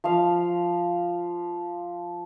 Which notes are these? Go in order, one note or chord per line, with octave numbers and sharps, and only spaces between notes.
F3 F5